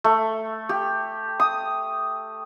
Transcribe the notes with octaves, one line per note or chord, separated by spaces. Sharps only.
A3
G4
D#6